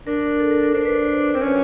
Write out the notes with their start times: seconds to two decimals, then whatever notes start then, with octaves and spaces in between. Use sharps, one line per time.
0.07 D4 A#4
0.40 A4
0.51 A#4
0.63 A#4
0.74 D4 C5
0.85 B4
0.96 C5
1.08 C5
1.35 C4
1.41 C#4 C#5